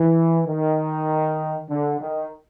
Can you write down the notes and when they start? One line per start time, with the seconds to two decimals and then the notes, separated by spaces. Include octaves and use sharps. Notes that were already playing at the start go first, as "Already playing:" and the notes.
Already playing: E3
0.47 D#3
1.70 D3
2.01 D#3